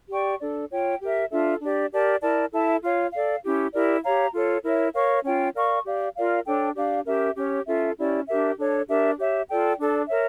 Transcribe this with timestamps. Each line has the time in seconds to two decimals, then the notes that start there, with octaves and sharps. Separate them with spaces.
0.10 G4 D5 G5 C#6
0.40 D4 A4 D5
0.70 F4 C#5 G5
1.00 G4 A#4 E5
1.31 D4 F4 A4 E5
1.61 D4 G4 D5
1.92 G4 A#4 D5 A5
2.22 E4 A#4 D5 A5
2.52 E4 A4 E5 A5
2.82 F4 C#5 F5
3.13 A4 D5 F5
3.43 C#4 E4 G4
3.73 E4 G4 A#4 D5
4.03 G4 C#5 F5 A#5
4.34 F4 A4 C#5
4.64 E4 A#4 C#5 E5
4.94 A#4 C#5 F5 C#6
5.24 C#4 F4 C#5 G5
5.55 A#4 D5 F5 C#6
5.85 G4 D5 F5
6.15 F4 A#4 D5 F5
6.45 D4 A4 C#5 G5
6.76 D4 G4 D5 F5
7.06 C#4 G4 A#4 E5
7.36 C#4 G4 C#5
7.66 C#4 F4 A4 E5
7.97 C#4 E4 G4 D5
8.27 D4 G4 A#4 E5
8.57 D4 A4 C#5
8.88 D4 G4 A#4 E5
9.18 G4 C#5 E5
9.48 F4 A4 D5 G5
9.78 D4 A4 D5
10.08 A#4 C#5 E5